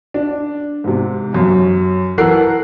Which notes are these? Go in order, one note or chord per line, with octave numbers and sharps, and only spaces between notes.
D4
G#2 C3
F#2 C#4
E3 A4 A#4 F#5 F#6 C7